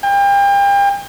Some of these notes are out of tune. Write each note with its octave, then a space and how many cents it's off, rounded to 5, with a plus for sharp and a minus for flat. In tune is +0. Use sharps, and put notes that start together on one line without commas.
G5 +35